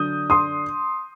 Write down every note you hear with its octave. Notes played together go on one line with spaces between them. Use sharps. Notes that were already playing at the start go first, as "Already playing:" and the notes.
Already playing: D3 F#3 D4 D#6 G6
C6 D#6